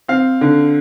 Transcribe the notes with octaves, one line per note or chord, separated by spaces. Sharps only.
C4 F5
D3